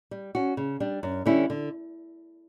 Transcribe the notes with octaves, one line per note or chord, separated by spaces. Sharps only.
G3
C#4 F#4
C#3
G3 D4
F#2
D3 G3 C#4 E4
D3